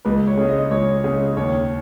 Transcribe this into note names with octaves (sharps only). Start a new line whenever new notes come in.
C#2 B4
C#5
C#3 G#3
D#5
C#2 C#5
C#3 G#3
D#2 C#5